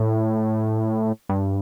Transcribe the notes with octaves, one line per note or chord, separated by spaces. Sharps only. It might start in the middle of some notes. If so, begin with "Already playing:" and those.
Already playing: A2
G2